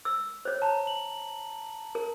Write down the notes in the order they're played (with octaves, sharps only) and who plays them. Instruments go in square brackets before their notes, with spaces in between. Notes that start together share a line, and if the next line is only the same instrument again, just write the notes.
[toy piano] E6
C5 C#5
[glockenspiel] A5 A#5
F#7
[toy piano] A#4